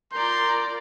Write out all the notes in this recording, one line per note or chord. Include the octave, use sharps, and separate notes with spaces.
F4 A#4 D5 A#5 C6 G6